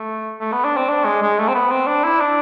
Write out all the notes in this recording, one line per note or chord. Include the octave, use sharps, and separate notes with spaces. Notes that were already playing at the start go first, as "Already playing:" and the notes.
Already playing: A3
A3
B3
D4
C4
D4
G#3
G#3
A3
C4
B3
C4
D4
E4
D4